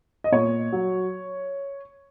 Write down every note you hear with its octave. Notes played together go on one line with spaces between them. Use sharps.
D#5
A#2 C#5
F#3